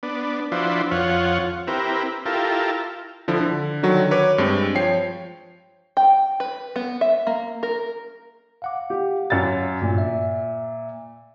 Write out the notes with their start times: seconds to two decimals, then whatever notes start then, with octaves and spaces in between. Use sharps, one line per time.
0.03 B3 D4
0.52 F3 D4 E4 F#4 B4 C5
0.91 F2 F4 C#5 F#5
1.67 C4 E4 G4 A#4 B4
2.26 E4 F4 G4 A4 A#4
3.28 D3 F3 E4
3.41 D3
3.83 D3 D#3 F#3 F#4
4.11 A#4 B4 C#5 D6
4.38 G2 G#3 C4
4.75 F3 C#5 G5 C7
5.97 G5
6.40 B4
6.76 B3
7.01 E5
7.27 A#3
7.63 A#4
8.62 F5 F#5 D6
8.90 G4
9.30 F#2 A6
9.82 G2 A#2
9.98 E5